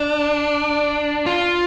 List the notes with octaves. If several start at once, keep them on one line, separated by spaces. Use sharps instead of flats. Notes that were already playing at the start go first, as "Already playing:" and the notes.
Already playing: D4
F4